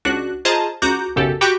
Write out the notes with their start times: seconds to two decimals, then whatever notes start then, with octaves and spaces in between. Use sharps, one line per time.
0.05 C#2 D4 F#4 F#6
0.45 F4 G#4 C5 D#5 A5 A#5
0.82 C#2 F#4 A#5 D6 G6
1.16 B1 F#2 C#3 G4 A4
1.41 F#4 G4 G5 B5 C#6 D6